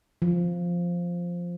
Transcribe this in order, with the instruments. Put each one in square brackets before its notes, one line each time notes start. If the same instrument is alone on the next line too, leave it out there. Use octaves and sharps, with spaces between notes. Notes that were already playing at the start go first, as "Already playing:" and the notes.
[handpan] F3